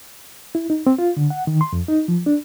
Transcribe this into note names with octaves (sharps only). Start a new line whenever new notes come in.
E4
D#4
C4
F4
D3
F#5
D#3
C6
F2
D#4
F3
D4